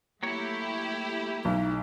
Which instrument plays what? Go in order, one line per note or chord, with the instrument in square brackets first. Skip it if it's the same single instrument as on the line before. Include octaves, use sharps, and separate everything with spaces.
[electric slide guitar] F#3 A#3 C#5 [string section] A3 E4 G4
[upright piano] B1 [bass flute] D#4